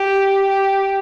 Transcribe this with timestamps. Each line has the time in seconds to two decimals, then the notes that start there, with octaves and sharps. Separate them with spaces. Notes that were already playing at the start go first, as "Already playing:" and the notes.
Already playing: G4
0.50 G4